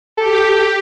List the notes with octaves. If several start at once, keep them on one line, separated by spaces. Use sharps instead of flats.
G4 A4